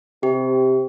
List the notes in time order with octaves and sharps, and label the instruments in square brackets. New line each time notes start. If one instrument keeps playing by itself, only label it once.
[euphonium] C3 [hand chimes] G4